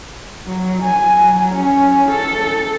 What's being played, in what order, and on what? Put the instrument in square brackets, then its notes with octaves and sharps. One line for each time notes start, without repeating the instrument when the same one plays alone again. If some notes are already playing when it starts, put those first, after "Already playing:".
[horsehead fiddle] F#3
G#5
F#3
C#4
A4